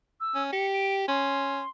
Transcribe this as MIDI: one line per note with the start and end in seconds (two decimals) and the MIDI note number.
0.21 0.43 88
0.35 0.52 61
0.52 1.06 67
0.52 0.67 97
0.73 0.94 98
1.08 1.62 61
1.08 1.69 84